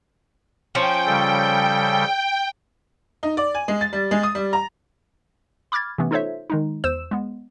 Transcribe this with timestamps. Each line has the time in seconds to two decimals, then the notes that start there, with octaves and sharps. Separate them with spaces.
0.75 F3 C#4 G5
1.06 C#3 G3 A4
3.23 D#4
3.37 D5
3.55 G#5
3.68 G#3
3.81 A6
3.93 G3
4.11 G#3
4.23 D#6
4.35 G3
4.53 A#5
5.72 B5 D6 F6 G#6 A6
5.98 C3 E3 A3 B3 C#4
6.11 D#4 F4 A4 C5 C#5 E5
6.50 D#3 G#3 D#4
6.84 E2 C5 E6 E7
7.11 G#3 B3